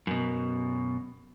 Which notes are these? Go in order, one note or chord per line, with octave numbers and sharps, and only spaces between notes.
F#2 B2